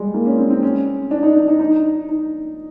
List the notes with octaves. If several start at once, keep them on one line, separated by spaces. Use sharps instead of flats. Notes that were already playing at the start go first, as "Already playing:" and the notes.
Already playing: G3 G#3
A#3
C#4
C4
C4
C#4
D4
D#4
D4
D#4
D#4
D#4